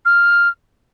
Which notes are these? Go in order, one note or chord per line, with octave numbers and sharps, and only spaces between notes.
F6